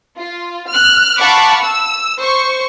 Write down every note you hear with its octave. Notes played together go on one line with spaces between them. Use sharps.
F4
F6 F#6
F5 F#5 A5 B5 C#6 D6
E6
C5 C#6